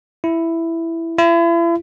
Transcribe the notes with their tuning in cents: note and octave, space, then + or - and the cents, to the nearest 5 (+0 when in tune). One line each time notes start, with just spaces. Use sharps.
E4 +5
E4 +40